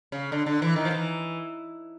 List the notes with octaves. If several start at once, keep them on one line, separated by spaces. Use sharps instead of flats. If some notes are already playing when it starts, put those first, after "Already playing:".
C#3
D3
D3
E3
D#3
F3
E3